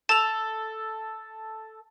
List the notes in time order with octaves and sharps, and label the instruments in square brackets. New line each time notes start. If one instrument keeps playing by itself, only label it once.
[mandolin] A4 [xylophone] A5 F7